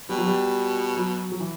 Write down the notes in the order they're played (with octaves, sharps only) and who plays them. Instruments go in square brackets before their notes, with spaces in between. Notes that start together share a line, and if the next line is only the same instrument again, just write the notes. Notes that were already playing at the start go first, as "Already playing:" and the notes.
[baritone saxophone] B2 [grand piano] G3
[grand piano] F#3
G3
F#3
F#3
E3